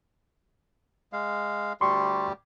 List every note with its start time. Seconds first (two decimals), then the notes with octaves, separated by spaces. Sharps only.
1.13 G#3 F5
1.81 D2 G3 G4 C6 C#6